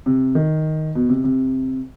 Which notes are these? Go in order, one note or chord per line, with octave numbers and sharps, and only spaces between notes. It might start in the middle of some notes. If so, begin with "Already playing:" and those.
C3
D#3
B2
C3
C3